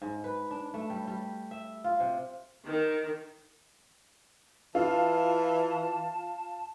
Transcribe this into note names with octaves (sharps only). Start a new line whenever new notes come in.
G#2
B4
D4
A3
G3
G3
E5
F4
C3
D#3
E3 F4 A5